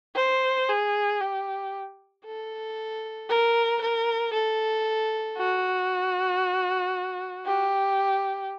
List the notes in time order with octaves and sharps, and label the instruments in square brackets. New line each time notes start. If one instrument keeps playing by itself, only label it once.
[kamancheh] C5
G#4
G4
A4
A#4
A#4
A4
F#4
G4